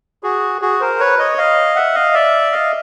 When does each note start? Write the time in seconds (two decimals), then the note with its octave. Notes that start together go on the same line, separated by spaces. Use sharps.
0.23 F#4 G#4
0.61 F#4 G#4
0.81 A#4 C5
1.00 B4 C#5
1.19 C#5 D#5
1.38 D#5 F5
1.76 E5 F#5
1.95 D#5 F5
2.14 D5 E5
2.52 D#5 F5